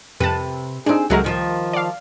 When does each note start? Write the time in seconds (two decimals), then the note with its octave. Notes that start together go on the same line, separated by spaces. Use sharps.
0.20 F2 C3 B4 A5
0.86 C4 D4 D#4 G#4
1.10 C#2 F#3 G#3 A3 C4 A#4
1.24 D#3 F3 F4
1.73 D5 F5